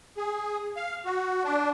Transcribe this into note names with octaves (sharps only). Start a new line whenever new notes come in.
G#4
F5
F#4
D4